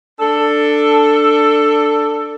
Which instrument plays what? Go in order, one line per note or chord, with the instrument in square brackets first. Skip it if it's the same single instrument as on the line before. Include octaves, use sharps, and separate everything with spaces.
[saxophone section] D4 A4